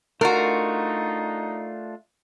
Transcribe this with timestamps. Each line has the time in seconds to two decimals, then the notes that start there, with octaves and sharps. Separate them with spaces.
0.21 A3 D4 D#4 F4 F#4 A#4